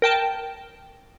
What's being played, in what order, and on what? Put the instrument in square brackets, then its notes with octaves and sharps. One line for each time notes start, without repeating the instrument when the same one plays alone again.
[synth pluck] A#4 G5 A5